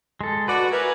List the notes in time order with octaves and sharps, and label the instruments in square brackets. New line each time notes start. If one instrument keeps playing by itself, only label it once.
[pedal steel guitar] G#3 A4
[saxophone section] F#4 [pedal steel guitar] B4 D5
[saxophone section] E4 A#4 B4 [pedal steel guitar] G#5